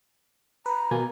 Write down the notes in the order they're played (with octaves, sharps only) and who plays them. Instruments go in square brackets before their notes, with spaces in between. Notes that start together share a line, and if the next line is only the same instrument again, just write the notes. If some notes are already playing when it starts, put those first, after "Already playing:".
[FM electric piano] B4 [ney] A#5
[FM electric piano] B2 A#3 G#5